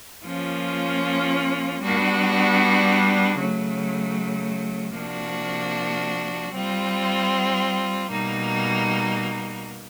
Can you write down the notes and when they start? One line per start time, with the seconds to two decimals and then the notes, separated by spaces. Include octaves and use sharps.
0.24 F3 A#3 C#4 F4
1.81 G3 B3 D4 F#4
3.38 C#3 F#3 A3
4.95 C3 F3 A#3 D4 F#4
6.53 G3 C4 F4
8.10 B2 G3 A#3 D#4